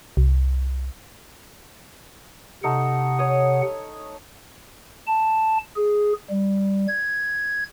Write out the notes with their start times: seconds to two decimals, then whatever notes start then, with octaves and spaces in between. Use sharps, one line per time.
0.17 C2
2.64 C3 A3 D#4 F#5
3.19 C#5 D#6
5.07 A5
5.76 G#4
6.30 G3
6.88 G#6